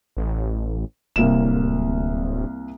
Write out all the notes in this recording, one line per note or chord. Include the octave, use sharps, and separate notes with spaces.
A1
D1 C2 A#3 E7